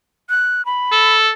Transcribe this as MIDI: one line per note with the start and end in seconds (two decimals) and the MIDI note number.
0.29 0.65 90
0.66 1.15 83
0.92 1.31 69